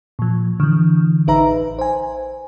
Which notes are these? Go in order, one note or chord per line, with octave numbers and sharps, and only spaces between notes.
A#2 F3
D3 E3
A1 D#4 B4 E5 A#5
C5 G#5